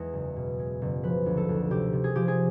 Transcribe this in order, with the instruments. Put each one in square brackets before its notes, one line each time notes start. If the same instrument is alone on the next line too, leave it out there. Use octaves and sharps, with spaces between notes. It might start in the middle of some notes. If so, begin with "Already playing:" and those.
Already playing: [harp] E2 G#3 D#5
F#1
B2
G#3
F#1
F3 B4
D2
A4
D2
C3 G4
C3
G#4
F3 G4
G#4